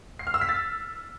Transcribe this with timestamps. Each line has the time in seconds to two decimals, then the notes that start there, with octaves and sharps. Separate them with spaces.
0.19 C7
0.27 F6
0.34 E6
0.41 B6
0.49 A6